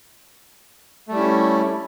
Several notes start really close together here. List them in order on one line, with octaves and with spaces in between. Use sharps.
A3 G3 E4 C#4